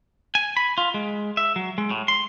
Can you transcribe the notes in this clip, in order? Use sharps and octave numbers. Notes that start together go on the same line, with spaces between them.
G#5
B5
F4
G#3
E5
F#3
G#3
A2
C6